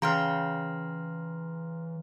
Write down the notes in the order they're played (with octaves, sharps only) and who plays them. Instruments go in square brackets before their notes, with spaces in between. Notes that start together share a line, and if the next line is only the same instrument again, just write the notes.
[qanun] C#3 G5 [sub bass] E3 [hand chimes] A#5 C6 F6